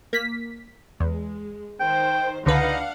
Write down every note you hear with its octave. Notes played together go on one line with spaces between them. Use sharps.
A#3 B6
E2 G#3
D#3 C5 G5
C#2 D3 D4 D#4 B4 F5 F#5